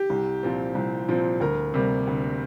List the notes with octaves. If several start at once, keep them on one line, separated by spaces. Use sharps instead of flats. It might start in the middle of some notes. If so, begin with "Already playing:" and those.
Already playing: G4
C2
A#2 F3 C4
C2
A#2 F3 C4
D2 A#4
C3 G3 A#3
D2